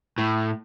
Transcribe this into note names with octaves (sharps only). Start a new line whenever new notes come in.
A2